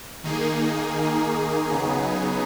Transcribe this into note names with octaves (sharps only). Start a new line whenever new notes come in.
D#3 A#3 D#4 G#4
C#3 F#3 B3 D#4 G#4